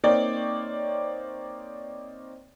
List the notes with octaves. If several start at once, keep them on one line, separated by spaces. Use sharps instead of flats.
A#3 C4 D#4 C#5 D5 G5